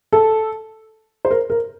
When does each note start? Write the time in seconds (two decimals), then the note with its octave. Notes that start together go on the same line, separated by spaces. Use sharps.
0.13 A4
1.25 C5
1.31 A#4
1.50 A#4